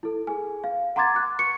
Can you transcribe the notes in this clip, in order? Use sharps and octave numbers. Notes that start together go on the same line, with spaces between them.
E4 A4
G#4 G#5
F5
F#5 A#5 C6 D6 G#6 A6
D6 F#6
C#6 C#7